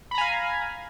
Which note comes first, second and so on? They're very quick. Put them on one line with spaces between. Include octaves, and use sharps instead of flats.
B5 A#5 G#5 F5